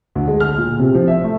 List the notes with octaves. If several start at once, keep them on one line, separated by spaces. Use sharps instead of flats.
D2
G#3
F6
A#2
C3
F3
E5
A3